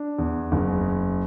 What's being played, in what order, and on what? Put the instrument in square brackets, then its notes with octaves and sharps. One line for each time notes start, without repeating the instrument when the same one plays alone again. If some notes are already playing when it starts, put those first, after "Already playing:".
Already playing: [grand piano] D4
E2
F#1